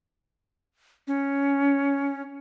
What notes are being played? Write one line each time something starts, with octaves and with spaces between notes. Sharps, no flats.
C#4